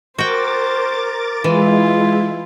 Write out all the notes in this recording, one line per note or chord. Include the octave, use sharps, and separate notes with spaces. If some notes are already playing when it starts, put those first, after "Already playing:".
F#4 A#4 C5 G5 D6 A6
E3 G#3 E4 F4